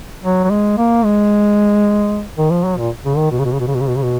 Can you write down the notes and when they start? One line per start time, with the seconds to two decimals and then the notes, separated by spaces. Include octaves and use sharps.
0.24 F#3
0.44 F#3
0.50 G#3
0.78 A#3
1.04 G#3
2.37 D#3
2.50 F3
2.64 F#3
2.77 A#2
3.04 C#3
3.17 D#3
3.31 B2
3.39 C#3
3.45 B2
3.52 C#3
3.60 B2
3.67 C#3
3.74 B2
3.80 C#3
3.88 B2
3.96 C#3
4.02 B2